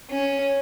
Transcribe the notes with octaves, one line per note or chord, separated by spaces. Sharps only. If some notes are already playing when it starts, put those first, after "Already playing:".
C#4